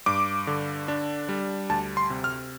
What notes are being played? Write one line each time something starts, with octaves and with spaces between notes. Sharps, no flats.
G2 D6
D3
D4
G3
D2 A5
C6
C3
F6